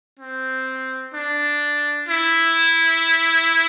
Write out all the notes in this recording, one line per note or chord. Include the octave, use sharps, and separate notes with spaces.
C4
D4
E4